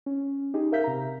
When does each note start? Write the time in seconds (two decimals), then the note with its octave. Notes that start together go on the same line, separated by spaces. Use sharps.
0.06 C#4
0.54 D#4 G4 G#4
0.72 A#4 E5 F5 G6 B6
0.84 C3 A#5